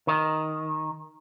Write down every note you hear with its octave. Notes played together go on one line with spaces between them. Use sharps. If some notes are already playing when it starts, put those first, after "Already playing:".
D#3